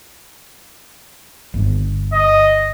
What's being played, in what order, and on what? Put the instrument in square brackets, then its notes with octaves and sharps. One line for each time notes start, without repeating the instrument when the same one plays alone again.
[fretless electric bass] G1
[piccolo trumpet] D#5